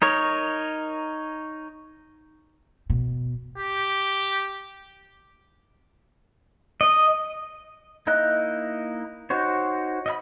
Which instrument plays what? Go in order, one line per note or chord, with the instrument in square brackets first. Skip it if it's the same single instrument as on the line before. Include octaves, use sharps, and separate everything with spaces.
[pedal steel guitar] D#4 A#4 C#5
[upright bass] B2
[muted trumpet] G4
[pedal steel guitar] D#5
A#3 D#4 E4 D#5 F#6
D#4 F#4 C5 C#5
D#5 E5 B5